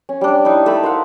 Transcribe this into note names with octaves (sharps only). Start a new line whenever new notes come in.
C#4
G3 D4
D#4 E4
A3 B5
A#4 C5 F5 F#5